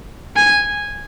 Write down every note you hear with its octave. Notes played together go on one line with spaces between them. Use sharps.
G#5